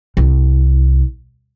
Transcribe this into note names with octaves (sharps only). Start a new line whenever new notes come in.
C2